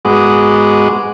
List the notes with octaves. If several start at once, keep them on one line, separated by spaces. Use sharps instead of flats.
G#2 G#3 B3 F#4 D#5 D6